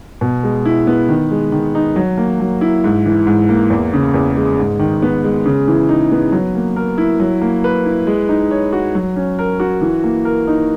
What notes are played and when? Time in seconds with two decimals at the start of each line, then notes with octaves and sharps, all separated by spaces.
0.21 B2
0.43 G#3
0.65 E4
0.87 B3
1.09 D#3
1.31 G#3
1.52 D#3
1.75 D#4
1.96 F#3
2.18 A#3
2.40 F#3
2.61 E4
2.84 G#2
3.06 E3
3.27 G#2
3.49 A#3
3.70 E2
3.93 C#3
4.14 E2
4.36 G#3
4.58 G#2
4.79 D#3
5.02 B3
5.24 G#3
5.46 C#3
5.68 E3
5.89 D#4
6.11 B3
6.32 F#3
6.55 A#3
6.76 A#4
6.98 E4
7.20 F#3
7.41 A#3
7.64 B4
7.86 E4
8.07 G#3
8.29 D#4
8.51 C#5
8.73 F#4
8.95 F#3
9.16 C#4
9.39 A#4
9.60 F#4
9.81 E3
10.04 A#3
10.25 A#4
10.47 D#4